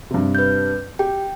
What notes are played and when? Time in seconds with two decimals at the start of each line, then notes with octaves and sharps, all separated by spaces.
0.10 G2 C3
0.35 B4 G6
0.99 G4 G5